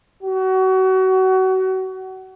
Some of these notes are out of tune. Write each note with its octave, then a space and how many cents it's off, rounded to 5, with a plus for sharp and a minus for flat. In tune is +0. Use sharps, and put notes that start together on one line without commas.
F#4 +30